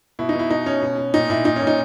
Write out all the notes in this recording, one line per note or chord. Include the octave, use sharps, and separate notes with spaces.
B2 E4
D#4
B2 E4
B2 D#4
B2 C#4
B2
B2
A#2 D#4
A#2 E4
A#2 D#4
C#4
A#2
D#4